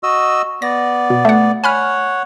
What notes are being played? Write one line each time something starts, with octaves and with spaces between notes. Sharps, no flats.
F#4 D#5 E6
B3 D5 A#6
B2
A3 F#5
C#5 F#5 G#5 B5 F6